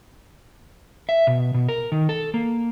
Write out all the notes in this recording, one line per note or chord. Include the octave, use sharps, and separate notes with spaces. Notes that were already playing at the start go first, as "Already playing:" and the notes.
E5
B2
B2
A#4
D#3
A4
A#3